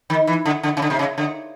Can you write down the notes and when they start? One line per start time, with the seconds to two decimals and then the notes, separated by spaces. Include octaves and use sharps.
0.10 D#3
0.27 E3
0.45 D3
0.63 D3
0.77 C#3
0.82 D3
0.90 C3
0.99 C#3
1.18 D3